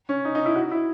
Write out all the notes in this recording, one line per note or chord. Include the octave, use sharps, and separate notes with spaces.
C#4
D#4
D#4
E4
F#4
E4